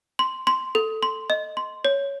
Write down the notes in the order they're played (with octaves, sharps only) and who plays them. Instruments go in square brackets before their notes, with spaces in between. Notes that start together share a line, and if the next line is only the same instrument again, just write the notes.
[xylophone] C6
C6
A4
C6
D#5
C6
C#5